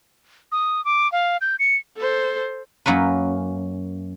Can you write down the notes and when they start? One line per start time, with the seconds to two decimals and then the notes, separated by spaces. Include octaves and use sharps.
0.52 D#6
0.85 D6
1.12 F5
1.41 G6
1.59 C#7
1.98 A4 C5
2.86 F#2 A#3 C#4 B4